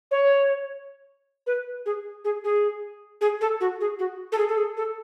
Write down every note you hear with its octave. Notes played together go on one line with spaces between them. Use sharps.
C#5
B4
G#4
G#4
G#4
G#4
A4
F#4
G#4
F#4
A4
G#4
A4
G#4
A4